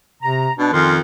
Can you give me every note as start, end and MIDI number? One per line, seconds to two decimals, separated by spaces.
0.23 0.49 48
0.23 0.53 82
0.59 0.69 47
0.59 0.71 62
0.73 0.98 41
0.73 1.01 51
0.73 0.92 61
0.73 0.92 70
0.73 0.92 84